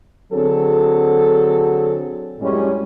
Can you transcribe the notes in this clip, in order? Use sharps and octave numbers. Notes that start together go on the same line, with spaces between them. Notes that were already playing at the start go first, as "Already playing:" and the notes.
D3 F#3 C4 G#4 A4
F#2 A2 G3 G#3 C#4